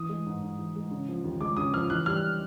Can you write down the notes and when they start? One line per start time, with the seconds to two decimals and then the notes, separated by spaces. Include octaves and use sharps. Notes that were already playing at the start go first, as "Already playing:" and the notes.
Already playing: E3 D#6
0.09 G#3
0.26 G#2
0.42 G#2
0.59 E3
0.76 G#3
0.91 C#3
1.08 F3
1.24 D#2
1.41 G#3 D6
1.57 C#3 D#6
1.73 F3 F6
1.90 E3 F#6
2.06 G3 F6